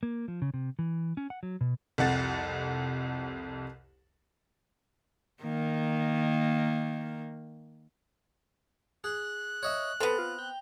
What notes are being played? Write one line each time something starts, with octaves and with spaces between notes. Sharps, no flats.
A#3
F3
C#3
C3
E3
C#4
F#5
F#3
B2
C2 F2 F#5 A6
D#3 A#3
G#4 F#6
C#5 D#5 E5
B3 C4 A4 A#5
F4
G5